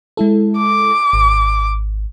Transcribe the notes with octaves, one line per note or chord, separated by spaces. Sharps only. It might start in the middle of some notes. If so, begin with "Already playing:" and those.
G#3 E4 A4
D6
G#1